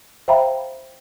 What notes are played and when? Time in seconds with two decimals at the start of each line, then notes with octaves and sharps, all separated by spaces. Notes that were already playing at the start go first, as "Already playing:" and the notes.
0.28 C5 E5 F5 G5 A#5 B5